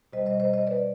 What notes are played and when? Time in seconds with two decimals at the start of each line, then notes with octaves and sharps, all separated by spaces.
0.13 B2 G3 C5 D#5
0.26 C5 D#5
0.40 C5 D#5
0.53 C5 D#5
0.67 B4 D5